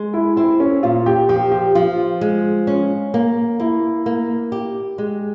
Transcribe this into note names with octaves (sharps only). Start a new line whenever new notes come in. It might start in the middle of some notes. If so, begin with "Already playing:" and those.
Already playing: G#3
E4
C4 E4
C#4
A#2 F4
G4
F3 G4
G4
F3 F4
G#3
C#4
A#3
A#3 E4
A#3
G4
G#3